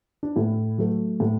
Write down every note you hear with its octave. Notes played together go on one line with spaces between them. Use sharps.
D4
A2 E4
F#3 A3
A2